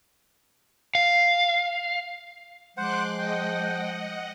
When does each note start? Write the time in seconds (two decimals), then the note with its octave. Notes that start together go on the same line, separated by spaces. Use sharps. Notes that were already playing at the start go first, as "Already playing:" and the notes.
0.95 F5
2.77 F3 G#3 C5 F#5 C6 D6 F#6
3.19 D#5 F#5 G5